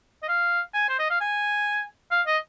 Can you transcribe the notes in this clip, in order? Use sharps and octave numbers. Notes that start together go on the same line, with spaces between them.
D#5
F5
G#5
C5
D#5
F5
G#5
F5
D#5